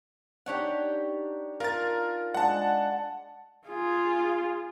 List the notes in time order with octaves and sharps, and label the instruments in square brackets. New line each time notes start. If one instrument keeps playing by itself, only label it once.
[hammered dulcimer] D4 D#4 [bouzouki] G4 C#5 F#5
[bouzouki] F4 [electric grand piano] A#4 A6
[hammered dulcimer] G#3 D4 [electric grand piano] F#5 A5
[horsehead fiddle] F4 G#4